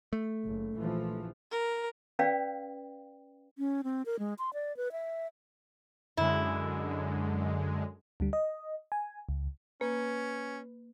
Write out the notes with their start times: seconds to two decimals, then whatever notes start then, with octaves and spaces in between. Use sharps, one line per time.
0.13 A3
0.45 F#1
0.78 A#1 E3 F3
1.51 A#4
2.19 C#4 B4 D5 F5 G5
3.58 C#4
3.84 C4
4.06 A#4
4.19 G#3
4.39 C6
4.53 D5
4.77 B4
4.92 E5
6.17 F#2 D3 G#3 E4
8.20 D2 D3 G3
8.33 D#5
8.92 G#5
9.29 C#2
9.81 A#3 C#4 B4